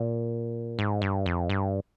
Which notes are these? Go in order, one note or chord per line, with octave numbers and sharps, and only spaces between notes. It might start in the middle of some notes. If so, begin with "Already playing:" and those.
Already playing: A#2
G#2
G2
F2
G2